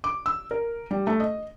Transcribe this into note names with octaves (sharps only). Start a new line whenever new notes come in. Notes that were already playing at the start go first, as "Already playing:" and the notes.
D6
E6
A#4
G3
A3
D#5